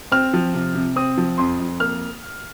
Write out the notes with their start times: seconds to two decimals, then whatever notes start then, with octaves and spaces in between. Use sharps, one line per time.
0.12 C4 F6
0.33 F3
0.54 C3
0.75 C3
0.96 C4 D#6
1.17 F3
1.38 F2 C6
1.60 F2
1.80 A#3 F6